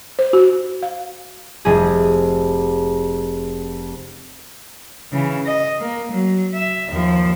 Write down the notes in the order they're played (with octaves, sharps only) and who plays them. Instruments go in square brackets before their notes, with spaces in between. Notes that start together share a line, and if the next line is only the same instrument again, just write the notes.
[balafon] C5
F#4
F5
[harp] F1 G#4
[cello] C#3 E3
D#5
A#3
F#3
E5
D#2 F3